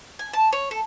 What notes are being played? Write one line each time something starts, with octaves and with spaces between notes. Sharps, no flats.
G#5
A5
C#5
A4